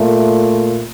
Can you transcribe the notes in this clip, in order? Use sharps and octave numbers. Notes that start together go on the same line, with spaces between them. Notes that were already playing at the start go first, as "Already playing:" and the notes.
Already playing: A#2 A3